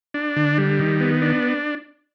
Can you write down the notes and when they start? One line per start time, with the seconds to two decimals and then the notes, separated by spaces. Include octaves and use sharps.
0.14 D4
0.36 D3
0.58 G3
0.79 D#3
1.00 B3
1.21 D4